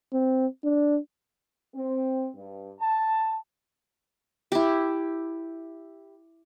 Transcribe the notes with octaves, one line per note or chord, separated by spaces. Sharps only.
C4
D4
C4
G2
A5
E4 G4